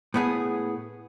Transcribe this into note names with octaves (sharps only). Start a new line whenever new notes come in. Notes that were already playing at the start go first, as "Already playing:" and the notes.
A2 B3 G#4